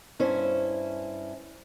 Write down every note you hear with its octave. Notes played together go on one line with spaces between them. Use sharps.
G2 C#4 E4 C5